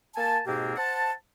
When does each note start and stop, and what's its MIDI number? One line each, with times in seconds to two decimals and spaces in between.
0.16 0.39 58
0.16 0.39 80
0.16 0.39 81
0.47 0.74 44
0.47 0.74 47
0.47 0.74 58
0.47 0.74 60
0.47 0.74 67
0.77 1.11 72
0.77 1.11 78
0.77 1.11 81